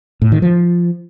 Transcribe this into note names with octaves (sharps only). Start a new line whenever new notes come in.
A2
D#3
F3